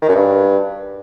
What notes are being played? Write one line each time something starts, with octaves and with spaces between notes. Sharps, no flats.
D#3
F#2
G2